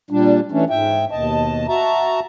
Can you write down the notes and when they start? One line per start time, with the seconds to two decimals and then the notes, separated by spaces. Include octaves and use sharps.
0.11 A#2 G3 D4
0.52 E3 A3 C#4 D4
0.70 G#2 E5 G5
1.11 D#2 B2 D#5 A5
1.68 F#4 E5 A5 A#5